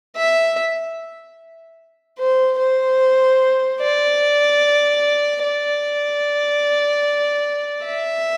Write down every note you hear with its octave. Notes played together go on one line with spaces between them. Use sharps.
E5
C5
C5
D5
D5
E5